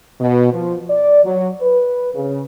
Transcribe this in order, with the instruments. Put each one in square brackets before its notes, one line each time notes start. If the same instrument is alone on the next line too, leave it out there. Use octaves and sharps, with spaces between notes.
[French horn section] B2
F3
D5
F#3
B4
C#3